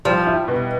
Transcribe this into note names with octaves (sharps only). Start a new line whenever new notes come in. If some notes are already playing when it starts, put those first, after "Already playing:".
F3 G3
E4
B2